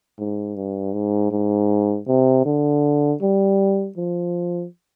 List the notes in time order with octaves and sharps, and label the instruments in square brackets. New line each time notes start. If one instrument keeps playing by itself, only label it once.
[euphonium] G#2
G2
G#2
G#2
C3
D3
G3
F3